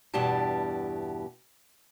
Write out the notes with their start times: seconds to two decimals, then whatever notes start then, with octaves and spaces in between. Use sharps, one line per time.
0.14 E2 G2 B2 E4 G4 A5